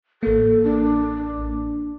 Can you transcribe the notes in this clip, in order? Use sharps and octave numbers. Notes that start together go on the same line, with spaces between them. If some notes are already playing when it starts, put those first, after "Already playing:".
A1 A#3 A4
D4